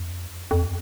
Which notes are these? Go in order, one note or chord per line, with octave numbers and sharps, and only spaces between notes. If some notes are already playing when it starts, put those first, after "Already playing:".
Already playing: F2
F2